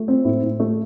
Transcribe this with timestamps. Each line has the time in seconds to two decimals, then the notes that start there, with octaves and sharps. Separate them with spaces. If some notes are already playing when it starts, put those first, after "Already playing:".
Already playing: A3
0.08 C4
0.25 A2
0.43 A2
0.60 A3